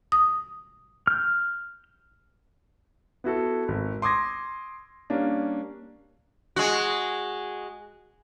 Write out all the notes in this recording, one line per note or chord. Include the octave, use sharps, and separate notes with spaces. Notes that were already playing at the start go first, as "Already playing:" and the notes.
D#6
F6 G6
B3 E4 F#4 A4
G#1
C6 D6 D#6 G#6 A#6
G3 A#3 C#4 D4
G#3 F#4